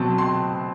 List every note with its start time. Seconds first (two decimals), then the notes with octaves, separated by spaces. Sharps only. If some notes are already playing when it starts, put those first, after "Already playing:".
Already playing: B2 F#3 C4 A5
0.18 C6